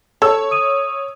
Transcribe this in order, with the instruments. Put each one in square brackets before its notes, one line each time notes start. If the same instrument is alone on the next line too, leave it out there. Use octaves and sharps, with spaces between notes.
[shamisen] A4 [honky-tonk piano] C#5 E6
[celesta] D#6 D#7